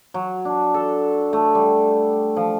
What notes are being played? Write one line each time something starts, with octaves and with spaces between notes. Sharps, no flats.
F#3
D4
A4
A3
G3
F3